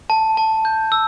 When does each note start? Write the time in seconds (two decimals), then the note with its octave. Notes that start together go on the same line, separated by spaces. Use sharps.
0.10 A5
0.37 A5
0.65 G6
0.92 E6